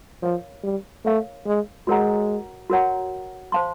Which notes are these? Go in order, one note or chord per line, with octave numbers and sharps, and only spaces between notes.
F3 A#4 C#5 F5
G3
A3 A#4 C#5 F5
G#3
G#3 F#4 A#4 C#5 F#5 A#5
F#4 A#4 C#5 F#5 A#5
C5 F5 A5 C6